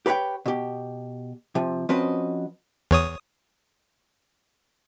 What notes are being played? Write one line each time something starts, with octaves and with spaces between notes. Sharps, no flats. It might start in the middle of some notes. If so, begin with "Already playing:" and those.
G4 B4 C#5 F#5 G5
B2 G4
C3 F3
F3 C4 C#4 F#4 B4 D#5
E2 C#5 D#6